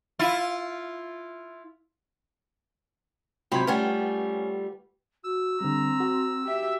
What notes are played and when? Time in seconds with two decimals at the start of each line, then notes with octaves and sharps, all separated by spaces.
0.19 E4 F4
3.52 G#2 C3 F#3 F4 G4 B5 C6 G#6
3.67 G3 A3 C#4 F4 B4 F#5 G5
5.24 F#4 E6
5.61 D3 G3 C4 A#5
6.00 F#4
6.44 G4 E5